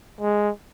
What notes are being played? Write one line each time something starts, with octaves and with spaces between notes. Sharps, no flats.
G#3